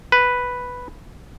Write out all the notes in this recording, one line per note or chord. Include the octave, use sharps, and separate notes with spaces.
B4